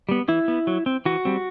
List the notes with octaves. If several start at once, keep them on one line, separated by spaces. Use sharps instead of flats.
G3 B3
E3 E4
B3
F#3
C4
E3 F#4
G3 C4